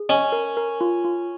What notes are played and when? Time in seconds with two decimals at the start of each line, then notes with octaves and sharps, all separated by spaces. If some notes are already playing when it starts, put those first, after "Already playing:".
Already playing: G#4
0.09 C#4 D#5
0.32 A#4
0.57 A#4
0.81 F4
1.04 F4